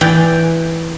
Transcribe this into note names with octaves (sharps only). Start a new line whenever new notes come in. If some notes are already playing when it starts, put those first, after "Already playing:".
E3 D5 G5